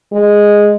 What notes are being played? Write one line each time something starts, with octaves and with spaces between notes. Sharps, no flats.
G#3